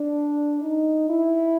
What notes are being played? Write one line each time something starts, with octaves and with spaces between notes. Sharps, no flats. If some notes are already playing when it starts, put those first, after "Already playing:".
Already playing: D4
D#4
E4